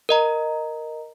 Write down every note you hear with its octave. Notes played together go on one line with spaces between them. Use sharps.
A#4 D#5 A#5